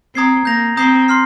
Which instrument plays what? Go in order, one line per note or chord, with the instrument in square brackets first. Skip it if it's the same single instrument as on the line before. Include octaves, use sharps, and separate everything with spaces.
[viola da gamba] C4 [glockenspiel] A#5 D#6 G#6 C7
[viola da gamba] A#3 [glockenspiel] G6 A#6 F7
[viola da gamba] C4 [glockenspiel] A#5 D#6 G6 C7
[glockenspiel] C6 F6 C7